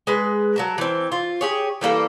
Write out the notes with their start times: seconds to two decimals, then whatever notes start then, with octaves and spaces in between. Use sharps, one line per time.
0.07 G#3 B4
0.56 F#3 A#4 A5
0.78 E3 C4
1.12 F4
1.41 G4 G#4 C#5
1.81 E3 G3 A#3 A4